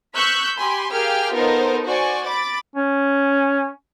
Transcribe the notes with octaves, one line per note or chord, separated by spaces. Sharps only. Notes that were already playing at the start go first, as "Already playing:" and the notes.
C#6 E6 F#6 G6 B6
G4 G#5 B5 C6
G4 G#4 A#4 F5 G5 F6
B3 D#4 F4 A4 A#4 C5
F#4 C5 D5 G#5 C#6
B5 D6 A6
C#4